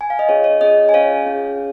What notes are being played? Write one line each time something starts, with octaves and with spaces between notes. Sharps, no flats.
G#5
F5
D#5
C#4 F4 G#4 C#5
C#5
C#4 F4 G#4 D#5
G#5
C#4 F4 G#4 C#5 F5
C#4 F4 G#4